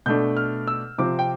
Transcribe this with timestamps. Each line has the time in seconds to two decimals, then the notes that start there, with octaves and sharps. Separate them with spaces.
0.06 B2 A3 D4 G6
0.37 F6
0.67 E6
0.98 C3 F3 C4 D6
1.19 G5